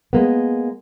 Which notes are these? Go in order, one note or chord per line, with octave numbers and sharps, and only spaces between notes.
G#3 A#3 B3